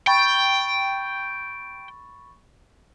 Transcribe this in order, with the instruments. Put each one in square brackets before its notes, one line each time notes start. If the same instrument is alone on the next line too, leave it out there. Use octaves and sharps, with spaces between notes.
[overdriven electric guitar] G5 [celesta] B5 C#6 A6